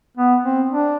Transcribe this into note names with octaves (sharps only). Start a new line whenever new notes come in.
B3
C4
D4